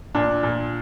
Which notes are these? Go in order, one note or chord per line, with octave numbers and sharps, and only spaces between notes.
A#2 D4
A#2